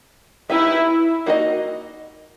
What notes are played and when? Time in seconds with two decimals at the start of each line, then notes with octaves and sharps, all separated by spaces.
0.50 B3 D#4 E4 G4 B4 E5
1.26 A#3 D#4 F#4 B4 D#5